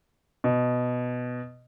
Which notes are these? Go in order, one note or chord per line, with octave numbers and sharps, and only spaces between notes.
B2